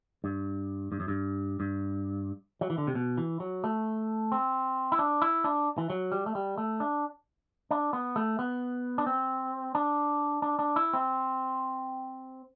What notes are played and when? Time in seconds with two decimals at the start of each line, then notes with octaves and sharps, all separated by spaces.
0.24 G2
0.92 G2
1.00 F#2
1.08 G2
1.60 G2
2.61 F#3
2.70 E3
2.78 D3
2.87 C3
2.95 B2
3.18 E3
3.40 F#3
3.64 A3
4.32 C4
4.92 E4
4.99 D4
5.22 E4
5.44 D4
5.78 E3
5.90 F#3
6.12 G3
6.26 A3
6.35 G3
6.58 A3
6.80 D4
7.71 D4
7.93 B3
8.16 A3
8.39 B3
8.98 D4
9.06 C4
9.75 D4
10.42 D4
10.59 D4
10.76 E4
10.93 C4